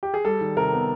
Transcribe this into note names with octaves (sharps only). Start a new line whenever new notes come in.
G4
G#4
G3 A4
D#3
C3 A#4
B3